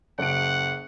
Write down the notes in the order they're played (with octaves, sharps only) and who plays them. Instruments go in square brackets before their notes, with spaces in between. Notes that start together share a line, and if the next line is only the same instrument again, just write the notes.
[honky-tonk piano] F#1 D7 [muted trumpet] F#5